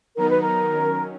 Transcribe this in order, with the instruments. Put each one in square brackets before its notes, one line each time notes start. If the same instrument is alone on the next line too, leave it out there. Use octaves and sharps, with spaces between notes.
[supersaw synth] D#3 F#3 B3 D#4 [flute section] A#4
[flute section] B4
A#4
[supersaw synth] D#3 F#3 C#4